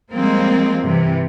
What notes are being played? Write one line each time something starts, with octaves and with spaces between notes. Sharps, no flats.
F3 G3 G#3 A#3 C4
G2 C3 E3